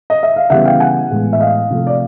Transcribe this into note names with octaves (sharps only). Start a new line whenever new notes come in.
D#5
E5
F5
C#3 E3 G3 B3 E5 F#5
F5 G5
F#5 G#5
A2 E3 G#3 B3
E5
D#5 F5
C3 F3 A3
D5